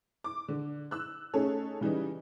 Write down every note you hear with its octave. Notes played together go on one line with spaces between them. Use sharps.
D6
D3
E6 F#6
A3 C#4 D#4 G#4 A4
C#3 E3 G3 D#4